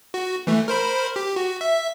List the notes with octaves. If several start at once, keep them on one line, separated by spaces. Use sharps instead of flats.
F#4
E3 A3
A#4 C5 B5
G4
F#4
E5